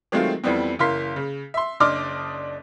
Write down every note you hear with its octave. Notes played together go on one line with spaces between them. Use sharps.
D#3 F#3 G#3 A3 C4 F4
F2 E3 G3 B3 C4
F#1 E3 A#4 F5 C6 B6
C#3
E5 C6
F#1 D4 D#5 C6 D6 F6